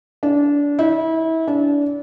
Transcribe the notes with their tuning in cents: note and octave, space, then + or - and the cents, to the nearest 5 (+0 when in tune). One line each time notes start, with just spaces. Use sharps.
D4 -25
E4 -30
D4 -30